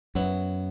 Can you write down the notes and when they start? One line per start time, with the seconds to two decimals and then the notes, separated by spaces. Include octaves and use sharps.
0.15 F#2 F#3 B3 E4